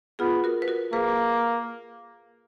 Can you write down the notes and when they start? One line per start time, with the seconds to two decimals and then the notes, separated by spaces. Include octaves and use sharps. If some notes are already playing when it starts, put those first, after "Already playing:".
0.19 B3 F4 G#4
0.44 F#4 A#4
0.62 B4
0.68 F#4 A#4
0.93 A#3 G#4 B4